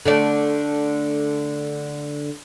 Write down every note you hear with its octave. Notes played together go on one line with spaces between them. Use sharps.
D3 A3 D5